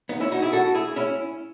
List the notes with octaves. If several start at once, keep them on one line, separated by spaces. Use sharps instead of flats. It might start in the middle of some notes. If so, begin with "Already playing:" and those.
B3 D#4
C#4 E4
D#4 F#4
E4 G#4
F#4 A4
E4 G#4
C#4 E4